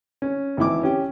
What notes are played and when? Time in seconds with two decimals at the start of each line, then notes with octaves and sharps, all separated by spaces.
0.22 C#4
0.57 G#1 E3 E4 D6
0.83 C#4 G4